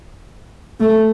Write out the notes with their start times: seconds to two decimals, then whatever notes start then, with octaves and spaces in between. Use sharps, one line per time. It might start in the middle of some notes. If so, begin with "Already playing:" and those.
0.80 A3